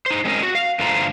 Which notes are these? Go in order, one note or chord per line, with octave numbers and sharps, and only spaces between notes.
D#4 C5
G#3 C4 C#4 A#4 D#5
F#4
F5
G2 D3 A3 F4 C5 A#5